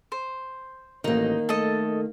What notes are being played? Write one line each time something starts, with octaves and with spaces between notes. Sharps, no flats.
C5
A1 D#3 A#3 D#4
A3 A4 D#5